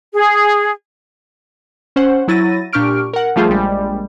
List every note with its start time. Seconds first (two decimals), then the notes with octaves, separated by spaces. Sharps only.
0.13 G#4
1.96 C#4 C5 F#5
2.28 F#3 E4 A6 A#6 D#7
2.73 A#2 D4 G4 C#6 F6 D7
3.14 A#4 F#5
3.36 F3 G3 A3 F4 G#4 C5
3.49 A#1 G3 G#3